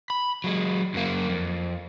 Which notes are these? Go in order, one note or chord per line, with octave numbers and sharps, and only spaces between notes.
B5
F#3 G#3
F#2 A#3
F2